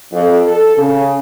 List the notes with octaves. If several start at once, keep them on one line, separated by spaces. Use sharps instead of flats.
F2
A4
C#3